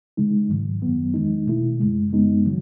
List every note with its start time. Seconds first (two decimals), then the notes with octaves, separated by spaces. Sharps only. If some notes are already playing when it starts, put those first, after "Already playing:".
0.17 C#3 G#3 D#4
0.49 G#2 D#3 F#3
0.82 F#2 D#3 F#3 B3
1.14 E2 D#3 G#3 D#4
1.47 B2 A3 E4
1.80 F#2 C#3 G#3
2.12 F#2 C#3 G#3 B3 D#4
2.45 D#3 F#3